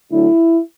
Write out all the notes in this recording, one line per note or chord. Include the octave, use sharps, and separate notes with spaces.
D3 F#3 A3 D4 E4